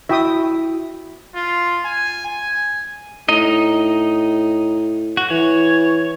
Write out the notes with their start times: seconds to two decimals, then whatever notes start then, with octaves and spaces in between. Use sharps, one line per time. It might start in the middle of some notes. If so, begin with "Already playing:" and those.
0.09 E4 F#4 E5 G5 D#6
1.36 F4
1.85 G#5
2.26 G#5
3.29 A2 D#4 D#5
5.17 F#4
5.30 E3 C#5